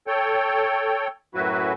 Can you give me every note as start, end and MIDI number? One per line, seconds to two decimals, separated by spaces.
0.07 1.07 69
0.07 1.07 73
0.07 1.07 79
1.35 1.73 42
1.35 1.73 45
1.35 1.73 54
1.35 1.73 64
1.35 1.73 66
1.35 1.73 71